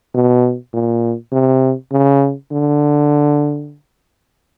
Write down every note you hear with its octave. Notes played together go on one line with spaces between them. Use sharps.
B2
A#2
C3
C#3
D3